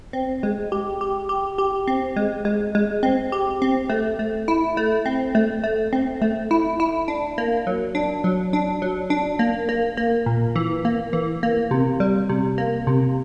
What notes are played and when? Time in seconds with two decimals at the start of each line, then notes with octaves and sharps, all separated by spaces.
0.13 C4
0.43 G#3
0.72 G4
1.01 G4
1.29 G4
1.58 G4
1.88 C4
2.16 G#3
2.45 G#3
2.75 G#3
3.03 C4
3.32 G4
3.62 C4
3.90 A3
4.19 A3
4.48 E4
4.77 A3
5.06 C4
5.35 A3
5.64 A3
5.93 C4
6.22 A3
6.51 E4
6.80 E4
7.08 D4
7.38 A#3
7.67 F#3
7.95 D4
8.24 F#3
8.53 D4
8.82 F#3
9.10 D4
9.39 A#3
9.69 A#3
9.97 A#3
10.26 A#2
10.56 E3
10.85 A#3
11.13 E3
11.43 A#3
11.71 C3
12.00 G3
12.29 C3
12.58 A#3
12.87 C3